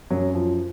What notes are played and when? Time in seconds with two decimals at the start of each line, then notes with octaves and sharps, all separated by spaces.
0.11 F#2 F#3
0.34 F3